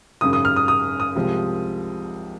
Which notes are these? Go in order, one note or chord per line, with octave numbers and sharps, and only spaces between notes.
G#1 F#2 C#3 D#6
D#6
F6
D#6
D#6
D#6
C2 C3 F3 G#3